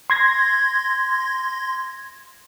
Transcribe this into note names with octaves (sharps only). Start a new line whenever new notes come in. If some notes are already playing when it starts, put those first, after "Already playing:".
C6 G#6 A#6